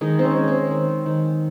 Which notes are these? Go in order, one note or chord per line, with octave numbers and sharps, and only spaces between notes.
D#3 G#3 D#4
C4
C#4
G#3
C4
D#3
D#3